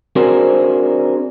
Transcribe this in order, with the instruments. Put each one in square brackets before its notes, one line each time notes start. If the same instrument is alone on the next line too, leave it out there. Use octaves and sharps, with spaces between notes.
[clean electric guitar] C4 D4 F#4 G#4 A#4 C5